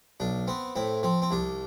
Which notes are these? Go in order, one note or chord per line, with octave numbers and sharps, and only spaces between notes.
B1 D4
B3 C4
A2 C4
F3 C4
C4
C2 D4